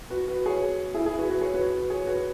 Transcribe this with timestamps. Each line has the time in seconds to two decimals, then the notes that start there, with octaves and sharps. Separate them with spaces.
0.10 F#4 B4
0.28 F#4 B4
0.46 G#4 C#5
0.94 E4 G#4
1.06 E4 G#4
1.18 F#4 B4
1.29 F#4 B4
1.41 G#4 C#5
1.54 F#4 B4
1.90 G#4 C#5
2.07 F#4 B4